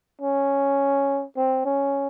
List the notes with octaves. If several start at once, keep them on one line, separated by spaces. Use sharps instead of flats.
C#4
C4
C#4